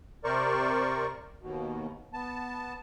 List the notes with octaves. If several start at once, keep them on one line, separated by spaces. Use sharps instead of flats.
C3 A#4 C5 D5 C#6
D#2 B2
B3 A5